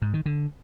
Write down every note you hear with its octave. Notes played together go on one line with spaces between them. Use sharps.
G#2
D#3
D3